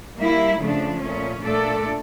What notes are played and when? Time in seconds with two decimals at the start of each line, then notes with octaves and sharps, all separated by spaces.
0.17 G3 A#3 E4
0.59 C#3 F3 A3 D4
1.00 A#2 A3 C#4
1.42 A#2 A3 D4 A4 D5